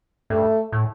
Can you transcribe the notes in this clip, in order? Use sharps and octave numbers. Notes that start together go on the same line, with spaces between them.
G2 A3
A2